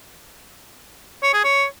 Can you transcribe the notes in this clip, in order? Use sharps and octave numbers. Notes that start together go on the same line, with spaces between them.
C#5
G#4
C#5